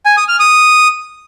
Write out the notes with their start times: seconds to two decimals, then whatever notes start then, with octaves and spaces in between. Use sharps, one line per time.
0.06 G#5
0.17 D#6
0.28 F6
0.40 D#6